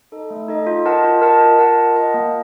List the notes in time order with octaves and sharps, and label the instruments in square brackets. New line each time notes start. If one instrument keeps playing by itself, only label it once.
[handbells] D#4 A4 D#5
A3
D#4 A4 D#5
F4
A#4 D#5 F#5 A5
F4
A#4 D#5 F#5 A5
F4
A#4 D#5 F#5 A5
F4
A#4 D#5 F#5 A5
A#3